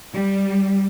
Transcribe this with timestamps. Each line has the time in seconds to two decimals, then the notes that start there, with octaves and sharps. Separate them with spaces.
0.13 G3